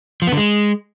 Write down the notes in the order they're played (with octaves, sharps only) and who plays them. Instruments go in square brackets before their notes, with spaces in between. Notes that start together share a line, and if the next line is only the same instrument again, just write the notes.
[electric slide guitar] F3
B3
D3
G#3